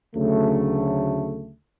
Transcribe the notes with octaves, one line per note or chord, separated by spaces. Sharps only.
D2 C#3 F#3 A3